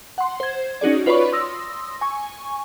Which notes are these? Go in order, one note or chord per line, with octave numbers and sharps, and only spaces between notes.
F#5 C6
C5 G#6
C#4 D#4 F#4 G#4 D5
F4 B4 C#5 D5 B5 C#6
C6 D#6 E6 A#6
G#5 C#6